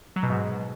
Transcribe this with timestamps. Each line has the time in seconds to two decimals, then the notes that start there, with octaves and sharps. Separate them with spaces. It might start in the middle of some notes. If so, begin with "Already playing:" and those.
0.16 F#3
0.23 B2
0.30 G#2